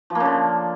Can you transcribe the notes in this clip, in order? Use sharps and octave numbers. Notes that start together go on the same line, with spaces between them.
F3
A#3
C#3
D3